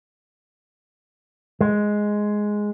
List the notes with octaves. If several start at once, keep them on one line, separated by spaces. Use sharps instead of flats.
G#3